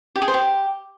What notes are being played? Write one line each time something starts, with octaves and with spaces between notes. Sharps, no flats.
G4
G#4
C5
G4